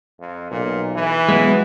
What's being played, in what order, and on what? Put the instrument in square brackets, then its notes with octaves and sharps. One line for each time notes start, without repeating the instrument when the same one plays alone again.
[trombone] F2
[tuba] B1 [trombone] A#2
[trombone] E3
[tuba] F#3 [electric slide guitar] G#3 A#3 B3